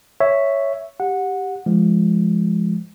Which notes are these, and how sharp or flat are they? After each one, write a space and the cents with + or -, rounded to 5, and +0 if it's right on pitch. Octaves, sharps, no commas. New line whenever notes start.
C#5 +0 E5 +0
G4 +0 F#5 -15
F3 -25 G#3 +0